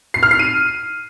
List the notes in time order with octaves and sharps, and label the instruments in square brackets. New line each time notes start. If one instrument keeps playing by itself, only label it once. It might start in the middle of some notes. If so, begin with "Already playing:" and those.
[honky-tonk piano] C7
F6
C7
D#7